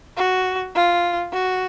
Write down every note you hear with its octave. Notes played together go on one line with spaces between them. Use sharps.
F#4
F4
F#4